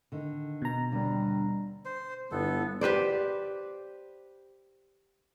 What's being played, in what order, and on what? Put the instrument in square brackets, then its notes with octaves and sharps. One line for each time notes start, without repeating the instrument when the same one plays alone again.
[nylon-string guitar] D3 D#3
[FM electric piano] B2 A#5
[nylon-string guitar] D#2 D3 D4 [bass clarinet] G3
[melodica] C5
[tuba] G1 [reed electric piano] G3 E4 [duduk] B3 [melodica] A4
[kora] G4 B4 C5 D5